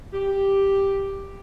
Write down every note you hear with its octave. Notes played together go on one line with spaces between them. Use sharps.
G4